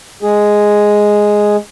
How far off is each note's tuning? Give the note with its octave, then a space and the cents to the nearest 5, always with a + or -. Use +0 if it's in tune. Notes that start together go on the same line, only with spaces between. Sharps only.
G#3 +0 G#4 +0